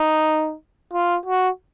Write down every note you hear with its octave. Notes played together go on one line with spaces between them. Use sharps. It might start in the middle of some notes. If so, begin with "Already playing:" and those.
Already playing: D#4
F4
F#4